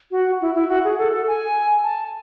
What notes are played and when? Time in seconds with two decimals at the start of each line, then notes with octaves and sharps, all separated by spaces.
0.11 F#4
0.41 E4
0.55 E4
0.69 F#4
0.84 G#4
0.98 A4
1.12 A4
1.27 G#5
1.84 A5